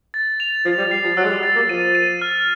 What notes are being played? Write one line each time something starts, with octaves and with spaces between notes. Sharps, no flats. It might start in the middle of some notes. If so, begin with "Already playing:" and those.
A6
F7
F3 A6
G3
G3 C7
F3
F#3 E6
G#3
G3
A6
A#3
F3 D#7
D#7
F6